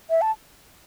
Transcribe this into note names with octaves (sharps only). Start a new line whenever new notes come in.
E5
A5